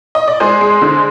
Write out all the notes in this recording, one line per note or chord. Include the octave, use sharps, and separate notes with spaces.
D#5
D5
G#3 G#4 C5
G#3
D3